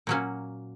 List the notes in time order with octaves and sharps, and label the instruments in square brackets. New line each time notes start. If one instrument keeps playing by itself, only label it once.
[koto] A#2 F#3 A#3 C#4